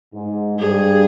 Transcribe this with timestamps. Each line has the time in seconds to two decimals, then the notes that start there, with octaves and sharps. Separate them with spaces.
0.13 G#2
0.59 G2 G#4